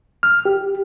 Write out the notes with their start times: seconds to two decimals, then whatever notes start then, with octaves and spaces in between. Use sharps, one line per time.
0.23 F6
0.45 G4